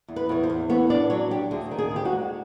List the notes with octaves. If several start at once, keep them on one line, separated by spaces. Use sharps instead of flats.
E2
B4
E2 C#5
C5
E2
B3 C#5
D4 D5
F#3 C#5
D4 G4
D2 G#4
D#3
G#4
D2 G4
F#4
G#3